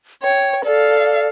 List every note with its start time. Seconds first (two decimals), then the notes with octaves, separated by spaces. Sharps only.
0.23 C#5 G5
0.64 A4 D5 F5